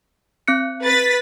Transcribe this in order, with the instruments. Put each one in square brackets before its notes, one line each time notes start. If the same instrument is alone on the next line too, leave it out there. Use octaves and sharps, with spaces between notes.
[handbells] C4 F#6 C#7
[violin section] B4 A6 B6